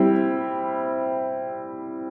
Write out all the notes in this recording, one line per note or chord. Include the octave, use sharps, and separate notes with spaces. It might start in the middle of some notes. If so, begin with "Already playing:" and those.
Already playing: G3 C4 E4